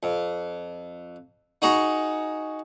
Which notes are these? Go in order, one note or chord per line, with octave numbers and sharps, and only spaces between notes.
F2
D#4 F#4 G#4 A#5 C#6